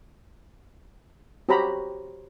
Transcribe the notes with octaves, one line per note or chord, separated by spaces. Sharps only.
F#4 G4 C5 C#5 A#5 B5